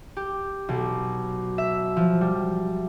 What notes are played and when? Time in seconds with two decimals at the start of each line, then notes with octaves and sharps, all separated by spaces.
0.17 G4
0.69 B1
1.58 E5
1.96 F3
2.21 G3